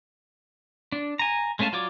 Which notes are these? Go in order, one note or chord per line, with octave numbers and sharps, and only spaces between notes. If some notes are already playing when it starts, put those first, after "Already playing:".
D4
G#5 A#5
G#3 A3 C#4 F5 A5
F#3 F4 C#5 D5 D6